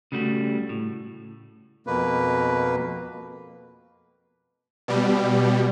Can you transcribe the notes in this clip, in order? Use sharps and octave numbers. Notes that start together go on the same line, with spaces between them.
C#3 G3 A3 F#4
A2
F2 B2 A#3 B4
B2 G3